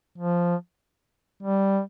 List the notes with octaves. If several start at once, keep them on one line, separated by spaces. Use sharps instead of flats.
F3
G3